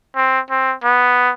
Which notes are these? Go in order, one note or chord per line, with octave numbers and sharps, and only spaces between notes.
C4
C4
B3